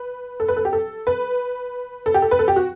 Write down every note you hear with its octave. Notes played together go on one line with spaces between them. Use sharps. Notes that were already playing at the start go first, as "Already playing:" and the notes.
Already playing: B4
A4
B4
A4
G4
A4
B4
A4
G4
A4
B4
A4
G4
F#4